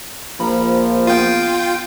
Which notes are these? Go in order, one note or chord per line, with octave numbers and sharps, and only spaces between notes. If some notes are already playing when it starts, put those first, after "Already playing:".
A#1 F3 A#5 B5
B3 F4 G5 F6 D#7